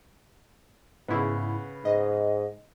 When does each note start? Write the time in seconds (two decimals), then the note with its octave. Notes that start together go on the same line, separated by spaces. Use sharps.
1.08 G#2 C#3 B3 E4
1.85 G#2 D#5